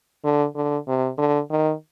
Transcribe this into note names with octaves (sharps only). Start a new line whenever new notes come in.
D3
D3
C3
D3
D#3